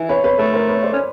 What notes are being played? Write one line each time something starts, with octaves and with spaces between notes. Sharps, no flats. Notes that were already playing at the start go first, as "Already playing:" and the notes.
Already playing: E3
B4 C#5
B4 C#5
A3 A4 B4
A#4 C5
B4 C#5
C5 D5
C#4